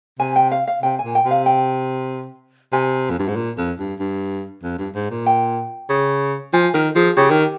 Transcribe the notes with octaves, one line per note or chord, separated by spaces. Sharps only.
C3 G#5
G5
F5
F5
C3 G5
G#5
A#2
G5
C3
F5
G5
C3 G#5
F2
G2
G#2
A#2
F2
G2
G2
F2
G2
G#2
A#2
G5
C#3
F3 G#5
D#3 A#4
F3 G#4
C#3 G4
D#3